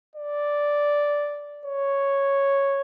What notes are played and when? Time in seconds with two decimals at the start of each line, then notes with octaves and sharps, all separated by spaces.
0.15 D5
1.66 C#5